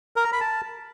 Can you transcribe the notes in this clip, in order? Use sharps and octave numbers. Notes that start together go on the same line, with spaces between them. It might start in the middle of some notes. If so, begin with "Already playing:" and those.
A#4
A#5
B5
A5